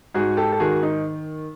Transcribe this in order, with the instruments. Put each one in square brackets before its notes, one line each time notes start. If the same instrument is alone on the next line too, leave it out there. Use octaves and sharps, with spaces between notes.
[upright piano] G#2 F#4 G#4
G4 A4
A4
D#3 F#4 G#4
D#4